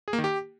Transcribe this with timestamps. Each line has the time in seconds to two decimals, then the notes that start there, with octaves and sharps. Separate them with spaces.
0.08 G#4
0.13 A#3
0.18 D#3
0.24 G4